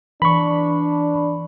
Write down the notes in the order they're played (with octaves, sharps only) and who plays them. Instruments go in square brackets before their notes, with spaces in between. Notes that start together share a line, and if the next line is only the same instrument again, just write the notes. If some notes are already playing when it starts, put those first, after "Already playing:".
[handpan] E3 [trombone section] D4 [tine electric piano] B5 C#6